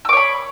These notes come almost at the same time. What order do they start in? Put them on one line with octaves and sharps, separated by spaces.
E6 D6 C#5 B5